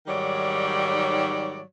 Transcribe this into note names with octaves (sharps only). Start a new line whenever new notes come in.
G#2 D#3 F#3 G3 C#5 D5